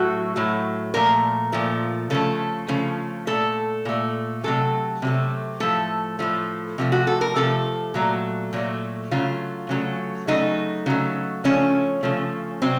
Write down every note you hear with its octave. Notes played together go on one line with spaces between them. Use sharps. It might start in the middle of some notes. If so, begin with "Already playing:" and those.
Already playing: A2 F#3 A3 F#4
A2 F#3 A3
A#2 F3 A3 A#4
A#2 F3 A3
C#3 F3 A3 A4
C#3 F3 A3
A#2 A3 A4
A#2 A3
C3 F#3 A3 A4
C3 F#3 A3
A2 F3 A3 A4
A2 F3 A3
C3 F3 A3
F#4
A4
A#4
C3 F3 A3 A4
A#2 F#3 A3
A#2 F#3 A3
C#3 F#3 A3 F4
C#3 F#3 A3
C#3 F#3 A3 D#4
C#3 F#3 A3
C#3 F3 A3 C#4
C#3 F3 A3
C3 F#3 C4